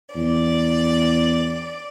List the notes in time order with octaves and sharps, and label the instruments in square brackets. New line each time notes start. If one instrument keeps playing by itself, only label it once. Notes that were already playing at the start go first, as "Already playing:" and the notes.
[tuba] E2 [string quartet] D5